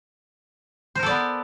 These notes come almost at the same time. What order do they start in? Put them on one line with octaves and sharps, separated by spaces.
C5 A#4 A4 D5 B3